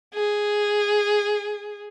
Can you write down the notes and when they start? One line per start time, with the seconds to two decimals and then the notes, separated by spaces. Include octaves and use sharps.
0.14 G#4